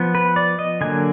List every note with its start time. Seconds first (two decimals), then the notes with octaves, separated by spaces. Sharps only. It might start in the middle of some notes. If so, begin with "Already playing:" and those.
Already playing: F3 B3
0.15 B4
0.36 D5
0.59 D#5
0.81 D3 F#3 A#3 G#5